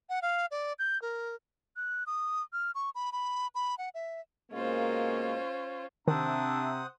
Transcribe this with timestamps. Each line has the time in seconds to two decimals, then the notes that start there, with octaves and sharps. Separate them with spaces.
0.09 F#5
0.22 F5
0.51 D5
0.79 G6
1.02 A#4
1.76 F#6
2.07 D#6
2.53 F6
2.75 C#6
2.95 B5
3.12 B5
3.55 B5
3.78 F#5
3.95 E5
4.51 B2 G#3 A#3 C#4 F4 C5
6.08 C3 D#3 D4 C5 E5 F#5 A#5 D#6